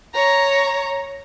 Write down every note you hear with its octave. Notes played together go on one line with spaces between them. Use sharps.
C#5 A#5